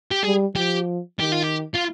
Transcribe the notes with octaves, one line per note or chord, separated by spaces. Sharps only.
G4
G3 G#4
F3 G4
D#3 G4
F4
G4
F4